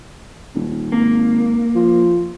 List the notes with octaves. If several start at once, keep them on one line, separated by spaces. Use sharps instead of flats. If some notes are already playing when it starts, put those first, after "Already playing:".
D#1
G#1 A#3
F3